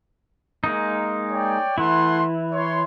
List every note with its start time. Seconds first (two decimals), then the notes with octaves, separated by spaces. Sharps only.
0.64 G#3 A#3 D#4
1.31 C#5 D5 G5
1.78 E3 A3 E4 F#5 C6
2.53 C#5 C6